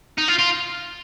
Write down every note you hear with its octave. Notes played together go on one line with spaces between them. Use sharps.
D#4
F4
F4